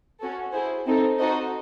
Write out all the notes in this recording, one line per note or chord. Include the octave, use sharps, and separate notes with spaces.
C#4 F#4 A4
E4 G#4 C5
C4 D#4 A4
D#4 F#4 A4 C5 D#5